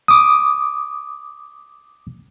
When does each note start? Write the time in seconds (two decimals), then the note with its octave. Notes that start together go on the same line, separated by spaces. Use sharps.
0.08 D6 D#6